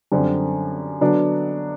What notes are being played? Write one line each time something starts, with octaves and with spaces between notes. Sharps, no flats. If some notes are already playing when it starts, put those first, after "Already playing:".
F#2 D3 G3 C4
D3 F#3 B3 D4